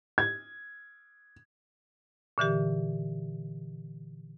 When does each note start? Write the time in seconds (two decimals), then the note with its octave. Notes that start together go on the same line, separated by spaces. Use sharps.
0.18 G#6
2.38 A#2 D3 E3 G4